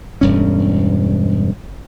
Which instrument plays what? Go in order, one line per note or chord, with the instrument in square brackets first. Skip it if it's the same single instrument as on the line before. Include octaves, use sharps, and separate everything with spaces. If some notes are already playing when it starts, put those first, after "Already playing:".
[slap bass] E1 G2 C#4